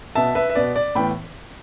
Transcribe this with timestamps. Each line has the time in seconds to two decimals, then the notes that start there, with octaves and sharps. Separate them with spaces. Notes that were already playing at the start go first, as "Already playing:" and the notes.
0.15 B2 B3 E5 A5
0.35 B4 E5
0.50 E5
0.55 B2 B3 D5
0.76 D5
0.95 A2 E3 B3 G5 B5